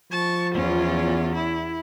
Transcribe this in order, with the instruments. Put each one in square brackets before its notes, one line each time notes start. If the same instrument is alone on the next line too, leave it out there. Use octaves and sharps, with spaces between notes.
[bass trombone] F3 [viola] A5 C#6
[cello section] E2 [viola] C#4 F4
[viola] E4